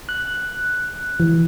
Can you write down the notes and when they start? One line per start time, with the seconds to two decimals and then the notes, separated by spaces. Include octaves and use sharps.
0.09 F#6
1.20 E3